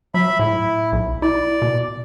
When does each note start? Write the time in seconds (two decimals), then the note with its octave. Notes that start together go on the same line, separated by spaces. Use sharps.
0.14 F#3 E5 B5
0.39 A2 E4
0.93 B1
1.22 E4 D5
1.62 B2